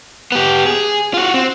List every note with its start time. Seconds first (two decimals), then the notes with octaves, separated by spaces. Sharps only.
0.32 B3 G4
0.66 G#4
1.14 F4 F#4
1.34 C4